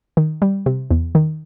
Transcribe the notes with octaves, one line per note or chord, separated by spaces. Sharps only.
D#3
G3
C3
E2
D#3